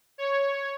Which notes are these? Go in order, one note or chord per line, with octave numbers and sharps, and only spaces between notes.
C#5